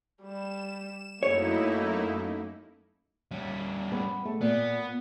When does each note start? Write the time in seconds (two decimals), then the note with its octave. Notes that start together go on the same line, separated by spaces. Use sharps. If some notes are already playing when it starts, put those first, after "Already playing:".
0.23 G3 E7
1.23 F#2 A3 A#3 D#4 E4 C#5
3.31 G3 C#4
3.92 B3
4.25 A3
4.41 A#2 B3